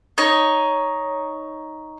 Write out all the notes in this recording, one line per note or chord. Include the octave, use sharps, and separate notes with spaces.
D#4 C#5